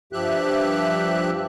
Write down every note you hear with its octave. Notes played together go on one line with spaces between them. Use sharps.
G2 F3 G4 E5 F#6